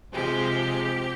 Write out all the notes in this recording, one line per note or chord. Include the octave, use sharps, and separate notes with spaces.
C3 F3 G#3 G4